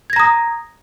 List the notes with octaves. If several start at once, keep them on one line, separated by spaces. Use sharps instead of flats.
A#5 D#6 G#6 A#6